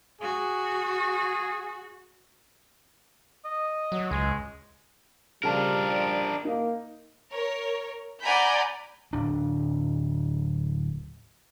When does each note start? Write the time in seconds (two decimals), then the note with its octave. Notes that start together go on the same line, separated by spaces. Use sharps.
0.21 F#4 G#4
3.45 D#5
3.92 F#3
4.11 C#2 G#3
5.43 C#3 F3 G3 D4 A#4 A5
6.45 A#3 D#4
7.32 A#4 C#5
8.21 D5 F#5 G#5 A#5 B5 G6
9.13 D1 D4